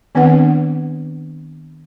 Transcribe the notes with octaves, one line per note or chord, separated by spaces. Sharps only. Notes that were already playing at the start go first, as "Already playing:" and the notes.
D#3 B3 C4 D4 B4 F#5